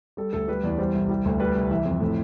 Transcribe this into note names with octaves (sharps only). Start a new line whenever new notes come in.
G3 A4
D2 A4
G3 B4
E2 D5
G3 C5
C2
G3
D2
G3 B4
C2
E3 E5
F2
A2